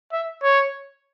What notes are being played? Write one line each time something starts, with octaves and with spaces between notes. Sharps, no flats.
E5
C#5